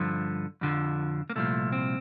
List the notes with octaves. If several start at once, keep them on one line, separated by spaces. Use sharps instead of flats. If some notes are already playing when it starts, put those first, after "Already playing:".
Already playing: G2 D3 F3
F2 D3 F3
A#3
C2 A#2 F3 A3
C4